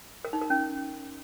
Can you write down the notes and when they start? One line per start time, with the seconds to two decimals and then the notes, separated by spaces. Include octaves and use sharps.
0.25 A#4
0.33 D#4
0.42 A#4
0.50 C#4